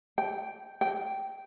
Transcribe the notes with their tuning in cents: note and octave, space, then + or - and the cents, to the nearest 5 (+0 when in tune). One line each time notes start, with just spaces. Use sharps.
G5 +0
G5 -10